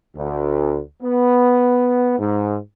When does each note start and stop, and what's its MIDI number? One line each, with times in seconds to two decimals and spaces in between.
0.15 0.80 38
1.02 2.16 59
2.19 2.57 44